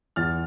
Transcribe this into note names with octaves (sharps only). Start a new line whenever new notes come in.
E2 F6 A6